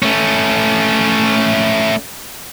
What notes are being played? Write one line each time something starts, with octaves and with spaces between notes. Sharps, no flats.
A3 C#4